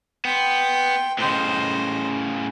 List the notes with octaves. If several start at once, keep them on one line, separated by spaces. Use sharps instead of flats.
B3 G5 C6
A2 C#3 C5 D#5